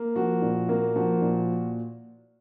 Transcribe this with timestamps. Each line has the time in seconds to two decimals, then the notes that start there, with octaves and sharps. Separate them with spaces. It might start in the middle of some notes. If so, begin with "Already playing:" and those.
Already playing: A#3
0.16 F3 F#4
0.42 A#2
0.69 A#3
0.96 F3 F#4
1.22 A#2